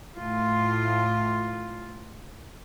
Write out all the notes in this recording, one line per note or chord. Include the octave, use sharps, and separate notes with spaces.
A2 F4